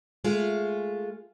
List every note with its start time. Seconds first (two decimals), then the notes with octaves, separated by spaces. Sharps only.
0.24 G#3 A3 F4